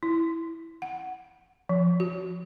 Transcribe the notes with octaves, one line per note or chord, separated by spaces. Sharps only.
E4
F#5
F3
F#4